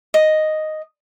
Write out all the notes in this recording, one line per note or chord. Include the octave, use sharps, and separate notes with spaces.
D#5